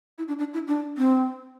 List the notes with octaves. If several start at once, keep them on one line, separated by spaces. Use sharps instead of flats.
E4
D4
D4
E4
D4
C4